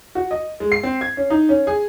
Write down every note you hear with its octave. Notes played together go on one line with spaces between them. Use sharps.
F#4
D#5
G#3
C7
C4
G#6
C#4
D#4
C#4
G#4